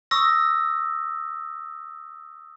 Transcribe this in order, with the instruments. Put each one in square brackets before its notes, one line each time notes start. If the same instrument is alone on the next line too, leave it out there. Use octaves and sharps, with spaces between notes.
[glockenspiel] C#6 D#6 E6 A#6